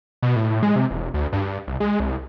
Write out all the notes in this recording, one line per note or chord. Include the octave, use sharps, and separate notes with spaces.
B2
A2
G#3
C3
E1
D2
G2
C2
G#3
C2